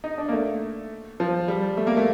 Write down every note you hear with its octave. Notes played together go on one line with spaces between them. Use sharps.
D#4
D4
A#3
A3
F3
G3
A3
A#3
A3